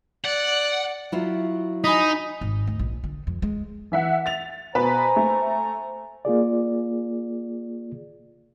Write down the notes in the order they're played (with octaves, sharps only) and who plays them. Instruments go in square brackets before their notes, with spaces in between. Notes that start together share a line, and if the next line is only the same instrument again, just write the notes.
[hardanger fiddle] D5 [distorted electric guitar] F#5
[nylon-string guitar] F#3 E4 F4
[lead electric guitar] D#4 [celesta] G#5 B5 B6 [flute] D#6
[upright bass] G#1
D2
A#1
D3
F2
G#3
[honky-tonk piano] E3 E5 F#5
A6 F7
[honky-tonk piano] B2 B4 [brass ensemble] C5 G#5 A#5
[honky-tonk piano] A3
[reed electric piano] A#3 F4 G#4 D5